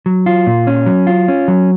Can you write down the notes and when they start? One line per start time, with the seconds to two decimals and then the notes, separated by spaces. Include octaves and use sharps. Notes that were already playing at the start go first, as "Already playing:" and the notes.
0.06 F#3
0.26 F4
0.47 A#2
0.67 C#4
0.86 F#3
1.07 F4
1.28 C#4
1.48 F#3